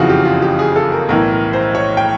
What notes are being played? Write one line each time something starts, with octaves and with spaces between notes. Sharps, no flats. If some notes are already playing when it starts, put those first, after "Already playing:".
Already playing: F#1 F2 C#3 E3 F4 F#4
G4
F4
G4
G#4
A4
A#4
B1 A2 E3 A#4
A#4
C5
C#5
G5